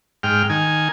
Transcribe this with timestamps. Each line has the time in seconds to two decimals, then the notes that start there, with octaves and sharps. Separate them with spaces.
0.23 G#2 G5 F6
0.50 D#3 G#5